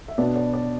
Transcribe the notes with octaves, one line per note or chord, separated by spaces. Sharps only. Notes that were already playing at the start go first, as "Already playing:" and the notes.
E5
B2 B3 D4 D5
D5
D5